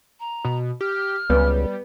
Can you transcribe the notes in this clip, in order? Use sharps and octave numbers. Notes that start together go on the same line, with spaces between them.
A#5
B2
G4 F6
C#2 G3 B3